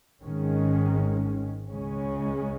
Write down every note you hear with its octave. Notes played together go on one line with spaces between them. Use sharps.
G#1 G#2 D#3 G#3 C#4
C#2 C#3 G#3 C#4